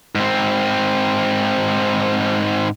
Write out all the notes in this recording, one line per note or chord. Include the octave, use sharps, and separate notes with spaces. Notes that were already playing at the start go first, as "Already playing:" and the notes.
G#2 C4